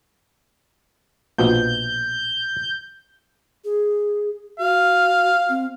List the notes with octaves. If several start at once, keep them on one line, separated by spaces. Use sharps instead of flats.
A#1 B2 F3 G6
G#4
F#4 F5
C4